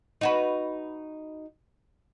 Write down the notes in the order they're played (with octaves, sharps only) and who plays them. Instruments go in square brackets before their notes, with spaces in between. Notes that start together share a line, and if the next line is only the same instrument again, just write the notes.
[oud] D#4 F#4 B4